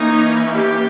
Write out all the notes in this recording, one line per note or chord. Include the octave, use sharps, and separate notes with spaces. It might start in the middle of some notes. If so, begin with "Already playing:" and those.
Already playing: E3 A#3 C#4 D#4
G4